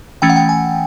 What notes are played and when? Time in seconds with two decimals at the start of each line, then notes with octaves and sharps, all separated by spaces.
0.22 E3 A3 C#4 G5
0.29 F#5
0.36 G5
0.49 G#5